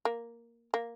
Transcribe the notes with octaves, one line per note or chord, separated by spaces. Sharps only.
A#3
A#3